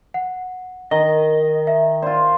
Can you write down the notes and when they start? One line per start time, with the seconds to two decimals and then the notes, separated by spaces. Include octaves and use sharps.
0.14 F#5
0.91 D#3 D#5 G7
1.67 E5
2.02 F4 C5 D5